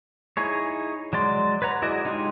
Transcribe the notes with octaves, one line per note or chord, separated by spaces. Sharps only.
D#4 E4 G#4 C#5
F#3 G#3 D5 C6
B4 C#5 F#5 A#5
E4 F#4 G#4 D5 D#5
G#3 D#4 F4 G4 G#4